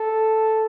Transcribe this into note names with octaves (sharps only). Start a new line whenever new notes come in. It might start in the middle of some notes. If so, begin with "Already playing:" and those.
Already playing: A4